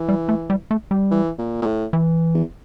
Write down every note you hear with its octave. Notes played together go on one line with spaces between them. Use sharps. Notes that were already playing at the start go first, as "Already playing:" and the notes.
Already playing: E3
G3
A3
G3
A3
G3
E3
A#2
A#2
A2
E3
E2